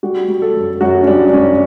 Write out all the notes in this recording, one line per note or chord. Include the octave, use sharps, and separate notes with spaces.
G3 F#4
G3
A4
F#2
F#2 F#4
C#4
G3 D4
D4
F#2 C#4